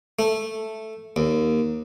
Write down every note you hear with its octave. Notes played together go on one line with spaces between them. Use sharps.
A3
D#2